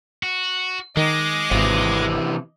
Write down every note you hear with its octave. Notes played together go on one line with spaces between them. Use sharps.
F#4
D#3 G#3 D#5 D6
G#1 C3 E3